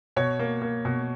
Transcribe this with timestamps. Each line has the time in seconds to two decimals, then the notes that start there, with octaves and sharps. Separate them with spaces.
0.16 B2 C#5
0.39 A#3
0.62 A#3
0.85 B2